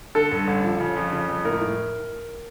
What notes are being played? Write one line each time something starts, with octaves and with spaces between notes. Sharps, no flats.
D3 A4
G2
A1
F3
C#3
F2
C#3
F2
A2 A#4
A2